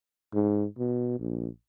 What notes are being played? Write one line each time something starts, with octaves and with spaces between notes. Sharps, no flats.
G#2
B2
A#1